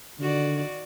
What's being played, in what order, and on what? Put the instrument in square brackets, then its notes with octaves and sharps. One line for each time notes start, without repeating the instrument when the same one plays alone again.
[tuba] D3 [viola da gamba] D#3 F#4 D5